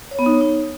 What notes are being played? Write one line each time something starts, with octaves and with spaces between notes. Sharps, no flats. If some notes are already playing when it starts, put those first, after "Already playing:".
C#5
B3
D#4
C#5
D#4